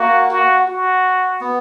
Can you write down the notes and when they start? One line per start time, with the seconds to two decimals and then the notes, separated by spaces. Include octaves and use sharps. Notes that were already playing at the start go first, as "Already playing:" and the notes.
Already playing: A#3 F#4
0.30 F#4
0.67 F#4
1.41 B3